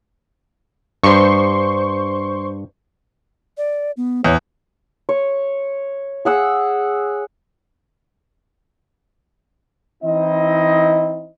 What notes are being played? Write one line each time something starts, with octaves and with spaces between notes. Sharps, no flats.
G2 C5 C6 C#6
D5
B3
E2 C#5
C#5
G#4 F#5 E6
E3 C4 D#4 E4 D#5